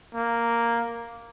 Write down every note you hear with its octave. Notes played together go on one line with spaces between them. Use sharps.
A#3